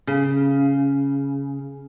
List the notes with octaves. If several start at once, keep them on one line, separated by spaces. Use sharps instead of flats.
C#3